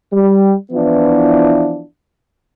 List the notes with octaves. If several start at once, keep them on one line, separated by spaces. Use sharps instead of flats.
G3
E3 F3 B3 D4 E4 F4